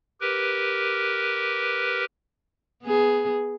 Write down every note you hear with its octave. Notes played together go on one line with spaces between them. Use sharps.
G4 A#4 B4
B3 G#4